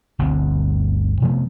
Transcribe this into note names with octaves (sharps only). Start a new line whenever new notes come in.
G1 D2 G2 C4
C3 F3 A3 B3